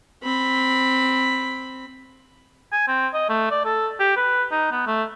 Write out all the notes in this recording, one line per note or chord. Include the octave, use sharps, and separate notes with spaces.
C4 B5
G#5
C4
D#5
A3
D5
A4
G4
B4
D#4
B3
A3